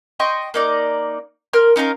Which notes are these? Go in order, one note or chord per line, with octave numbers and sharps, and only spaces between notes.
D#5 G5 C6 C#6
A#3 D#4 D5
A#4 C6 F6
C#4 D#4 F4 A#4